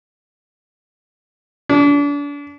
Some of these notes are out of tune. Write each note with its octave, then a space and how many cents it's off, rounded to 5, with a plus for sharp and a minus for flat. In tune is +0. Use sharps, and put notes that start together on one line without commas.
D4 -35